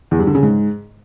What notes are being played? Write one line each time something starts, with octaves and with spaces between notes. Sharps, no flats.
E2
G2
D3
C#3
G#2